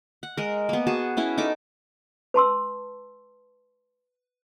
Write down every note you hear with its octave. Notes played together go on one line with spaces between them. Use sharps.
F#5
G#3 A#4
A#3 B3
F#4 G#4 A5
B3 C#4 E4 E5
D#4 A4 D6
B4 A5 C6 E6